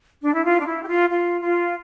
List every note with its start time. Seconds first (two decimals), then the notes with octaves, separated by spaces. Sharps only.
0.23 D4
0.33 E4
0.44 F4
0.59 D4
0.66 E4
0.83 G4
0.87 F4
1.10 F4
1.43 F4